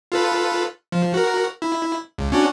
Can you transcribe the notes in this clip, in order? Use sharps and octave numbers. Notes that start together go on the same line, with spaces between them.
F4 A4 B4
F3
F#4 A#4
E4
C#2
C#4 D4 F#4